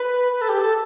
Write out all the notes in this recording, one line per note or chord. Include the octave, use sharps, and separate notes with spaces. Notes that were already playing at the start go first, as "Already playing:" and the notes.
Already playing: B4
B4
A4
G4
A4